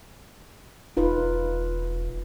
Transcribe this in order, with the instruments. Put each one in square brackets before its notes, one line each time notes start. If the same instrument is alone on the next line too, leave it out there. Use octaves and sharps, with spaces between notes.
[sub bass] E1 [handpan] D#4 F4 B4